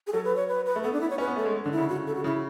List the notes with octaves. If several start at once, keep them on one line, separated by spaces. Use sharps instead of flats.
G#4
F#3 A4
B4
C#5
B4
B4
A3
B3 A4
D4
E4
C#5
C#4 B4
B3
A3 A4
G#3
D3 D4
E4
C#3
F#4
A4
F#4
C#3 E4